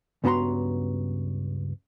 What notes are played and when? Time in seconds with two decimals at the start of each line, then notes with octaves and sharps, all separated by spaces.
0.24 C#2 G2 B3 F#4 A#5 C6